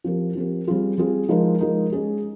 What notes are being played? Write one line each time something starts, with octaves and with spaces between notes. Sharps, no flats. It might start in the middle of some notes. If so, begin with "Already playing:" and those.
F3 C4 G4 A#4
F3 C4 G4 A#4
G3 C4 F4 G#4
G3 C4 F4 G#4
F3 G#3 D#4 A#4
F3 G#3 D#4 A#4
G#3 C#4 G#4